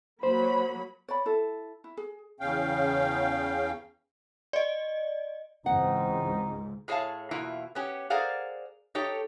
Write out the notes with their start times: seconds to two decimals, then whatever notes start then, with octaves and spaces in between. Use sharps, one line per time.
0.23 F#3 A#3 C5 B5
1.08 C#5 D5 B5
1.26 E4 A4
1.84 E4
1.97 G#4
2.40 E2 C#3 C#4 F5 G5
4.53 D5 D#5
5.66 C#2 G#2 E3 C4 D#4 F#5
6.88 A2 G#4 C#5 D5 F5 A5
7.31 E2 B2 A#3 E4 F4
7.75 B3 C#4 G4
8.10 G#4 A#4 C5 D5 F5 F#5
8.95 D#4 G4 A4 C#5